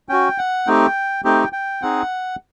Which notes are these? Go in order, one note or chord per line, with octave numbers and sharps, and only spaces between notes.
C#4 F#4 G5
F#5
A3 C4 D#4 G4 G5
A3 C4 D#4 G4 G5
G5
C4 D#4 G#4 F#5